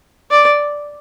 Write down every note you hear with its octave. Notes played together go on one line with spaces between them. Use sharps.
D5